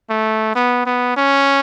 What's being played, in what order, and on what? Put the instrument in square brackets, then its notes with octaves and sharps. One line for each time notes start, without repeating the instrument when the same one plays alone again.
[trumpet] A3
B3
B3
C#4